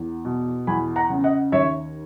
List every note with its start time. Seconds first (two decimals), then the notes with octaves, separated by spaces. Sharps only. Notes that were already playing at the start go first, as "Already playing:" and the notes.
Already playing: E2
0.25 B2
0.67 E2 G#5 B5
0.96 F#5 A#5
1.10 C#3
1.24 D#5 F#5
1.52 D#2 C#5 E5